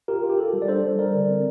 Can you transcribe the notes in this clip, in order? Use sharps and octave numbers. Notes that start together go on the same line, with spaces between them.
F4 G4 A#4
F4
G4
F4 A4
G3
D5
D4 A4 C5
G3
G3 A#4 D5
D3
C4